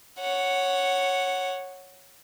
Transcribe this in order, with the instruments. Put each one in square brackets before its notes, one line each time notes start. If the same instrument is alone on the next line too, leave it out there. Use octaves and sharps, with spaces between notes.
[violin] C#5 F#5